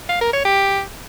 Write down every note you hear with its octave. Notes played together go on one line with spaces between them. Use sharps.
F5
A#4
C#5
G4